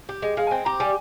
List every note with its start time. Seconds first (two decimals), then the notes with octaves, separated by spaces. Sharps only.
0.09 G4
0.22 G#3 D#5
0.37 G#3 F5
0.47 G#5
0.51 C4 G5
0.65 G4 A#5
0.80 G3 G#5